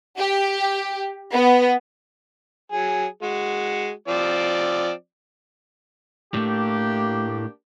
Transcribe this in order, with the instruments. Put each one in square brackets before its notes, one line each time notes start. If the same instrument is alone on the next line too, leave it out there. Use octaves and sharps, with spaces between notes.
[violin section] G4
B3
[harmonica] F#3 G#4
G#3 F#4
F3 C4 D5
[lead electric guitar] A2 A3 [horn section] A#3 D4 G4